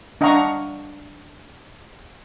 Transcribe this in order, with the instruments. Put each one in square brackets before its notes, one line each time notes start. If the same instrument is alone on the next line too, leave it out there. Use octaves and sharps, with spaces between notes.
[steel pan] D4 D#5 F5 F#5 A#5 C#6